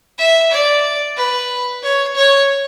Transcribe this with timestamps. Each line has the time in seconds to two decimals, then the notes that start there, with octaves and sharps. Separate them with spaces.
0.18 E5
0.52 D5
1.17 B4
1.83 C#5
2.15 C#5